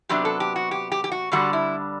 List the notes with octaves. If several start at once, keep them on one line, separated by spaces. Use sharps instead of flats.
C3 F#3 B3 D4 G4
A4
G4
F#4
G4
G4
G4
F#4
G2 D3 G3 D4 F#4
E4